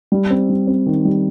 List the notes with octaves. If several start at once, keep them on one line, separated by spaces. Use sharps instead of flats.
G3
C4
G3
C4
D#3
G3